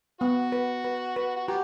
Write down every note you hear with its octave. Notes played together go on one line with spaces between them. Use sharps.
B3 F#4
B4
B4
B4
F#4
B3 F#4 G4